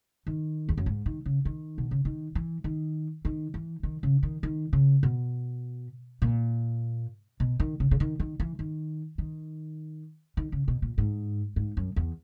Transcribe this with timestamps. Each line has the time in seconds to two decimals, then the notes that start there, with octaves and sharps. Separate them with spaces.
0.27 D#3
0.69 E2
0.77 F#2
0.86 G#2
1.06 D#3
1.26 C#3
1.45 D#3
1.78 B2
1.91 C#3
2.05 D#3
2.35 E3
2.64 D#3
3.25 D#3
3.54 E3
3.83 D#3
4.03 C#3
4.23 D#3
4.43 D#3
4.73 C#3
5.03 B2
6.22 A#2
7.40 B2
7.60 D#3
7.80 C#3
7.91 C#3
8.00 D#3
8.20 D#3
8.40 E3
8.59 D#3
9.18 D#3
10.37 D#3
10.52 C#3
10.68 B2
10.82 A#2
10.98 G#2
11.56 G#2
11.77 F#2
11.96 E2